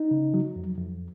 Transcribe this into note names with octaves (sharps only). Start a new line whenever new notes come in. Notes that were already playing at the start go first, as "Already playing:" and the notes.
Already playing: D#4
C#3
F#3
F2
F2